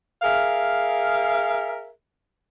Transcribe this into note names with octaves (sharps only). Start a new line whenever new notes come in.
G#4 A#4 E5 F5